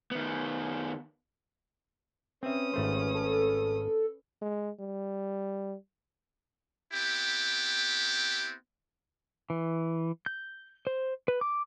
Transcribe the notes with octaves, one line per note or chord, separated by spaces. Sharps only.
D#3 B3
C4 C#4 B4 E5 D#6
G#1 A3 C5
A4
G#3
G3
B3 C4 E4 G4
E3
G6
C5
B4
D6